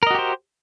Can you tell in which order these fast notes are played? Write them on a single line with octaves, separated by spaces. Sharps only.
A#4 D#5 F#4 G4 C5